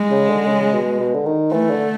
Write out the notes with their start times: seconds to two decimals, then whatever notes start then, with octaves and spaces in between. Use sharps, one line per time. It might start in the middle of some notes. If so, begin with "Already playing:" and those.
Already playing: G#3
0.11 C#3
0.29 D3
0.46 C#3
0.73 B2
1.00 B2
1.14 D3
1.26 D#3
1.52 E3 A3
1.70 D3